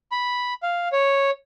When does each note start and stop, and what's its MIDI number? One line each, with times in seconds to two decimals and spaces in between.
0.12 0.54 83
0.63 0.88 77
0.92 1.30 73